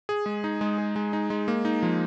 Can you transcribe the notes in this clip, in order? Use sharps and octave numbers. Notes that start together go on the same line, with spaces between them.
G#4
G#3
D#4
G#3
G#4
G#3
D#4
G#3
A#3
D#4
F3